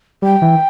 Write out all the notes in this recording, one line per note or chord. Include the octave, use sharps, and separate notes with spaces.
G3 G5
E3